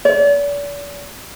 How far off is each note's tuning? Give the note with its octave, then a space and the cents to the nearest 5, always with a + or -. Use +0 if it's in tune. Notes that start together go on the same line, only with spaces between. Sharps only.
D5 -40